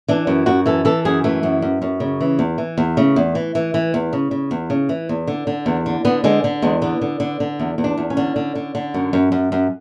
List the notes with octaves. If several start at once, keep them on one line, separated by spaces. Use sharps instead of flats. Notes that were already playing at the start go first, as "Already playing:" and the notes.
E3 D4
F#2
F#2 F#4
E3 A4
E3 A4
F#2 G#4
E3 A3
F#2
F#2
F#2
C#3
E3
E2
E3
E2
C#3 A3
E2
E3
E3
E3
E2
C#3
C#3
E2
C#3
E3
E2
D3
D3
E2
D3
D3 B3
D3 G#3
D3
E2 G#3
D3 B3
D3
D3
D3
E2
E2
D4
E2
C#4
D3
D3
D3
D3
F#2
F#2
F#2
F#2